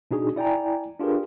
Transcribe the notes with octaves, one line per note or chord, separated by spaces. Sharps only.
B2 D4 D#4 F#4 G#4
E4 D5 G5 G#5 A#5
D4 F4 G4 G#4 A#4 B4